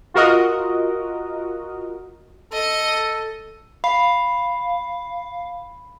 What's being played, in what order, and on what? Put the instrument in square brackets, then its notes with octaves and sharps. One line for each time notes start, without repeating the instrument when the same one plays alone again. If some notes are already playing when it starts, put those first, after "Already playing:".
[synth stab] F4 F#4 A#4 D#5
[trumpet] A4 [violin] D#5
[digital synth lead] F5 [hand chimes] B5